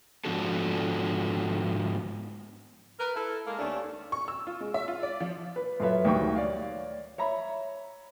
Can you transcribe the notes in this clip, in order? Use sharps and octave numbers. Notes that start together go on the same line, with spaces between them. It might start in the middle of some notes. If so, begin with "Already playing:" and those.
G#2 F3 B3 D4 F#4 A4
A#4 B4
E4 A4
G#3 A#3
D#2 A3 C#4 D4
C#6
E6
F4
G#3
E5
F4
D5
F3
B4
F#2 F4 A4 B4 C#5 E5
D2 D#3 G3 G5 C#6
C#5 D5 F5
C#5 E5 A#5 B5